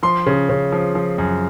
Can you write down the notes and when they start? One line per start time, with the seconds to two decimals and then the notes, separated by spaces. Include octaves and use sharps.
0.03 F3 C6
0.26 C#3
0.49 C#3
0.72 F3
0.95 F3
1.18 F#2